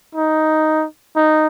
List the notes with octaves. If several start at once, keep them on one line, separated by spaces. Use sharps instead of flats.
D#4
D#4